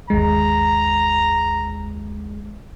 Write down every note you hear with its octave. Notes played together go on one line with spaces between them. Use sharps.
G1 D#2 G#3 A#5